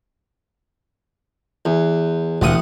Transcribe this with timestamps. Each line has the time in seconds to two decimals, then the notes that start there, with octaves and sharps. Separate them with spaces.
1.65 E2
2.42 E1 A1 D2 F#5 D#6